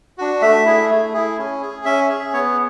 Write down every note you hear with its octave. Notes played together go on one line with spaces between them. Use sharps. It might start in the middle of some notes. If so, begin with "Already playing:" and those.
D4 F#4
A3 E5
E4 G#4
A3
E4 G#4
C#4
G#4
C#4 E5
G#4
B3 C#5